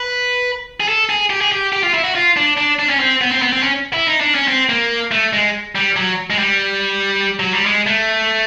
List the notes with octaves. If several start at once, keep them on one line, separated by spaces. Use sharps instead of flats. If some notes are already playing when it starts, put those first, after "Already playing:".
Already playing: B4
G#4
A4
G#4
G4
G#4
G4
G4
F4
E4
F#4
F4
D4
D4
D4
C#4
C4
B3
C4
B3
C4
C#4
E4
D#4
D4
C#4
C4
A#3
A3
G#3
G3
F#3
G#3
G3
F#3
G3
G#3
A3